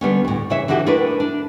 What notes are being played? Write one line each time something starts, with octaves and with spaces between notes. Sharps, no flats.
D3 G3 B3 C#4
D2 A2
C#3 E3 C#5 E5
D3 E3 D#4 F#4 G4
A3 D4 E4 A#4 B4
D4